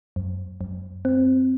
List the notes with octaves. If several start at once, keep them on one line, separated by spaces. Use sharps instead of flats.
F#2
F#2
C4